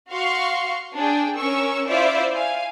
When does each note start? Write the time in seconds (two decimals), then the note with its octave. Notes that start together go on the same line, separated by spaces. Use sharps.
0.10 F#4 F5 C6 C#6
0.96 D4 G#4 G5
1.36 C#4 A#4 C#6 E6
1.87 E4 F4 C5 D5 E5
2.34 F5 G#5